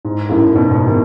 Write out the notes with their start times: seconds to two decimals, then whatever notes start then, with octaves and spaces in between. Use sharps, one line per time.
0.05 G#2
0.29 F#2 A2
0.54 G#2 B2
0.71 G#2 B2
0.87 B2 D#3